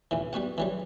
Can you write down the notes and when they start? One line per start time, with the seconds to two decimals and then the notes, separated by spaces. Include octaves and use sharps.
0.11 A1 D#2 E3
0.33 G3 B3 F#4 F#5
0.58 E3 F#3 G3